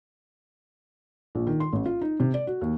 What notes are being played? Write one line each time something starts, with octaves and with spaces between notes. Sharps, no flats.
A#1
D#3
C6
A1
F4
D#4
C3
D5
F#4
D#2